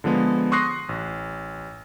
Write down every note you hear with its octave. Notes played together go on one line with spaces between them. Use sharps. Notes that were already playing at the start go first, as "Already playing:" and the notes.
D3 F3 G#3 B3
C6 C#6 D#6 F#6 A#6 C7
A1